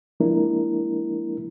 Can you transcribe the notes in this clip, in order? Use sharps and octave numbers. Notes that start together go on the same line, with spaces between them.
F3 G#3 A#3 D4 E4 A#4